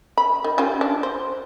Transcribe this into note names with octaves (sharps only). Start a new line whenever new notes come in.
B5
D#3
C#4 F4 G4
D4
C5